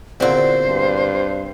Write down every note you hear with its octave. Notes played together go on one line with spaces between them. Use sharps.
E2 A#2 D3 C4 F#4 C5
G2